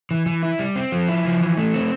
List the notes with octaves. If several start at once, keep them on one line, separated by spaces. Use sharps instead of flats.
E3
E3
E4
G3
C4
F3
E4
F3
E3
A3
C4